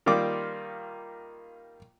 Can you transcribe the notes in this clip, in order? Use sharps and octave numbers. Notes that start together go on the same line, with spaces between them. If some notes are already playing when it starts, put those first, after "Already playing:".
D#3 G3 A#3 F4 D6